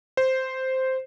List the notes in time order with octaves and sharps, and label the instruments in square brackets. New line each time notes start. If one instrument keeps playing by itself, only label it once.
[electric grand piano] C5